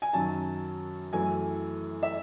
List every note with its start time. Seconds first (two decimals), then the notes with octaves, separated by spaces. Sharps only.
0.02 G#5
0.13 F#2 D#3 F#3 C#4 A5
1.13 F#2 E3 A3 G#5
2.03 E5